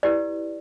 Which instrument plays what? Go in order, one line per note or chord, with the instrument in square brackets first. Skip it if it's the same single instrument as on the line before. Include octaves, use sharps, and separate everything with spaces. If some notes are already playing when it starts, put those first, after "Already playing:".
[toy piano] E4 G4 B4 D5